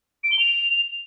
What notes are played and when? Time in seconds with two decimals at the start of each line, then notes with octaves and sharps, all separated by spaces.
0.24 D7
0.31 G7
0.39 F7